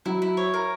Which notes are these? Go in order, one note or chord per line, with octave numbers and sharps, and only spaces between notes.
F#3 E4
E4
C#5
A#4